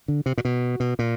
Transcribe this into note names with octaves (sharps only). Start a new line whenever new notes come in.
D3
C3
A#2
B2
B2
A#2